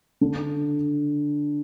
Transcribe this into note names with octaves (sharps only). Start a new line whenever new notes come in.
D3 D4